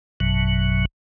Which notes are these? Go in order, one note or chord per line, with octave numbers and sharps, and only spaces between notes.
A1 F#2 B2 F#3